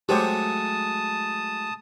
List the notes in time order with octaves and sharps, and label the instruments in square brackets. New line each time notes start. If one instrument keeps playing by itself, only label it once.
[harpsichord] F#3 G#3 A3 [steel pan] G4 C5 C#5 [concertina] A5 D#6